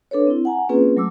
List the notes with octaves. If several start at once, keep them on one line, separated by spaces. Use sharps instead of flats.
D4 A4 B4 C#5
C4 E4
F#5 G#5 A#5
A#3 C4 C#4 F4 G#4 B4
F#3 A3 D6 E6